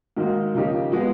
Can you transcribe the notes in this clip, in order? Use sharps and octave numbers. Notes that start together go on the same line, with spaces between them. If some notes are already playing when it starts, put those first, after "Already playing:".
G#2 D#3 F#3 A#3
C#3 F3 A#3 D#4 G4
F3 G#3 B3